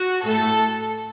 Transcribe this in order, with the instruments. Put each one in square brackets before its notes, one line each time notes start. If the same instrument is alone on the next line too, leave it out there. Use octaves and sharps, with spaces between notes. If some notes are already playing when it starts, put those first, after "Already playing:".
Already playing: [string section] F#4
A2 A3 A4